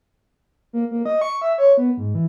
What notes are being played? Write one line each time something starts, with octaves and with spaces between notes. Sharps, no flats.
A#3
A#3
D#5
C#6
E5
C#5
B3
G#2
E3